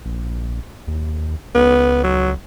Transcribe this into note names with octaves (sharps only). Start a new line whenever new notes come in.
A#1
D#2
C#2 B3
F#3